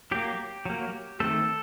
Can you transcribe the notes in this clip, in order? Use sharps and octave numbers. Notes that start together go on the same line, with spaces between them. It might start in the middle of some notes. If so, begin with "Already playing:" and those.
F#3 A#3 G4
F#3 A#3
D#3 A3 C4 A4